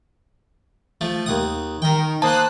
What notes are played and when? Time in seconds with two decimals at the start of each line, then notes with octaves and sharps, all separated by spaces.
1.01 F3 A3
1.26 D#2 F#5 D#6
1.82 D#3 A#4 G5
2.22 A#3 C5 A5 D#6 F#6